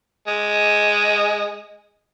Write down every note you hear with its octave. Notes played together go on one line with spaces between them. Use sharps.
G#3